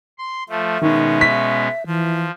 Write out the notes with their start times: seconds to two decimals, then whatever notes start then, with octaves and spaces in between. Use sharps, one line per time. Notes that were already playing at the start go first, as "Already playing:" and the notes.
0.18 C6
0.49 F3 A3 E5
0.82 B2 D#3 G#3 C#4
1.21 B6
1.86 E3 F3